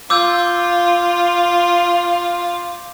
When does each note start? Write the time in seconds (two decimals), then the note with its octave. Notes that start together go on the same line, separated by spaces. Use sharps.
0.10 F4 D6 E6 G6